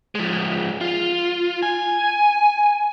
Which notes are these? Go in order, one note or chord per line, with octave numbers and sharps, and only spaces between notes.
F3 G#3
F4
G#5